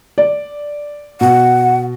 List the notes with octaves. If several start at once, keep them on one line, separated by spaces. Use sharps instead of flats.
D5
B2 F#5